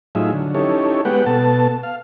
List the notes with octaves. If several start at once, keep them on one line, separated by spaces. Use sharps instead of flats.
A2 F#3 D#4 F4 G#4 E5
D3 F#3
C#4 D#4 E4 G4 A4 C#5
G#3 B3 G4 B4 F#5 G5
B2 B3 A4 A5
F5